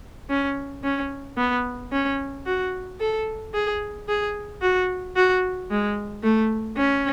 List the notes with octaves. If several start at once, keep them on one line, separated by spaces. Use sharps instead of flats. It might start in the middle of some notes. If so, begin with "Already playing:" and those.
C#4
C#4
B3
C#4
F#4
A4
G#4
G#4
F#4
F#4
G#3
A3
C#4